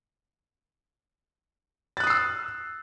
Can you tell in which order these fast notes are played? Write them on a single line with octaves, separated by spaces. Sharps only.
A6 F#6 D#6 C7 E6